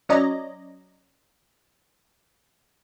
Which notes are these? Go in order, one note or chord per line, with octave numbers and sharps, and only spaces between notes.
F#3 C#4 D5 D#5 A#5